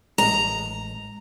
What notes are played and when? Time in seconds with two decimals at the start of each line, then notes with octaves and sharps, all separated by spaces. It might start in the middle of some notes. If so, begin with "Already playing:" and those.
0.18 A1 G#3 A#5